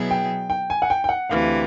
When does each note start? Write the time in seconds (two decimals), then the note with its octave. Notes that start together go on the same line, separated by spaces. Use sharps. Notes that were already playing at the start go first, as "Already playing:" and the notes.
Already playing: B2 F#3 B3 E4 G#4
0.11 G5
0.50 G5
0.70 G#5
0.82 F#5
0.90 G5
1.04 G5
1.09 F#5
1.29 D2 C3 E3 F5